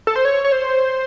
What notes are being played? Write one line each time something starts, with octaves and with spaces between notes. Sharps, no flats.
A4
C5
C#5
C#5
C5